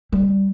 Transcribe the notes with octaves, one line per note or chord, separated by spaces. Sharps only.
G3